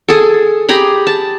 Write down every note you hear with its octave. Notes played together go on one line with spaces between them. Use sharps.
G#4 A4
G4 G#4 A#5 B5
A5